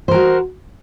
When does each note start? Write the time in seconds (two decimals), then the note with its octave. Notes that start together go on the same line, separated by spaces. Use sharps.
0.08 C5
0.11 A#4
0.14 F#4